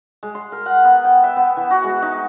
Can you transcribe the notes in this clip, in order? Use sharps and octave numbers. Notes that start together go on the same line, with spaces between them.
G#3
C6
A#4
F#5
B3
G5
E5
B3
E3
F#4
G#3
D#4